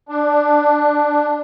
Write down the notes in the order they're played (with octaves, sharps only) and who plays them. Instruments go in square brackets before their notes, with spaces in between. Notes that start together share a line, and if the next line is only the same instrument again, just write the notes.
[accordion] D4